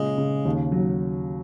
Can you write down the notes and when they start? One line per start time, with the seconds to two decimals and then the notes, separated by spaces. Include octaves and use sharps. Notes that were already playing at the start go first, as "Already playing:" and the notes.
Already playing: A#2 C#3 G#3
0.18 C#3
0.45 D#2
0.72 F#3